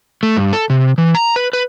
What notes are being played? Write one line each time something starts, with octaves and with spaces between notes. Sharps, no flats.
A3
G2
A4
C3
E3
A#5
B4
B4